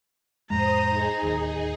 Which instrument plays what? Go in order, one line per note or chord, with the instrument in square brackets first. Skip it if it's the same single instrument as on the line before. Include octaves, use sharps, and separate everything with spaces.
[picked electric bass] F2 A2 G#3 [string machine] C5 D#6 [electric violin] A#5
[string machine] D#4 G#4
[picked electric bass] D1 D#2